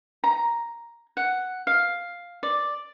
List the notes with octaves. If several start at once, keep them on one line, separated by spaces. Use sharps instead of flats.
A#5
F#5
F5
D5